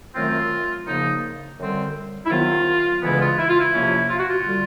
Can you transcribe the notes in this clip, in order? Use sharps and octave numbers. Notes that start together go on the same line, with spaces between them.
F#2 D#3 F#3 A3 C4 F4
F#2 C#3 F3 A#3 D#4
F#2 D3 G3 C4
E4
C3 D#3 F#3 B3 F4
D2 C#3 E3 G#3 B3 E4
F4
E4
F4
E4
C#2 C3 F3 A#3 C#4
F4
F#4
F4
D3 G3